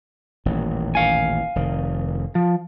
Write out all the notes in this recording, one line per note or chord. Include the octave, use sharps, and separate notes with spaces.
D#1 A1 D#2
F5 G#5
F1 D#3
F3